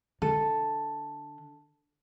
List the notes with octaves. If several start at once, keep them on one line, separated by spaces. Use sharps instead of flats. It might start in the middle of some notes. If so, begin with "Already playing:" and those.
D3 A4